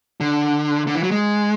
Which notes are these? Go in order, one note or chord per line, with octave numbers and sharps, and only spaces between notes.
D3
D3
E3
F#3
G#3